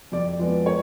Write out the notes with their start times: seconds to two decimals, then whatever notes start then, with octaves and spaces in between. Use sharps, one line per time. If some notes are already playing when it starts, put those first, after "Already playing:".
0.12 F2 D5
0.39 F3 G#3 B3
0.66 C#5